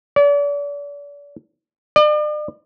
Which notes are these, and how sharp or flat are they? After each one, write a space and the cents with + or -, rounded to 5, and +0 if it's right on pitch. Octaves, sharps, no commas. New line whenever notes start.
D5 -40
D5 +40